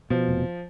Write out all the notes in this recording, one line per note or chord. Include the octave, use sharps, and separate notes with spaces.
B2 F3
F1